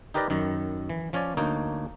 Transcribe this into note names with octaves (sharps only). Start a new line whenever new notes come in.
D#4 G4 A#4 B4 D5 D#5
F#2 D#3
E3
F3 C#4 C#5 D5
D2 A#3 D#4 C#5